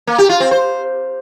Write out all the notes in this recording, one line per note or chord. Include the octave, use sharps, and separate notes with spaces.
A#3
G4
F4
C4
C5